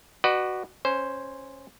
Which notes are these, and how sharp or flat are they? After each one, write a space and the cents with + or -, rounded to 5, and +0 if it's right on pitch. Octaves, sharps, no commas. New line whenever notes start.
F#4 +10 B4 +0 D5 +45
C#4 -10 C5 +0